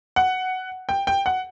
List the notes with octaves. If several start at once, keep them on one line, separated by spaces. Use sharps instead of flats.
F#5
G5
G5
F#5